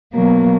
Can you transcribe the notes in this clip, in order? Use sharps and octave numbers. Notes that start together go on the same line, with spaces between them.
B2 F#3 A#3